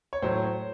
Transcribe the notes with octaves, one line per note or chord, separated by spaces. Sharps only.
C#5
A2 F#3 C5